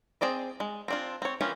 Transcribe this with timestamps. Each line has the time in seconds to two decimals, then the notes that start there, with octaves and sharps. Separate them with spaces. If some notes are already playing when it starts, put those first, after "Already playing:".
0.21 C4 G#4 D5 D#5
0.60 G#3
0.88 C4 D4 F4
1.22 C4 C#5
1.41 D#3 E3 A#3 C#4 F4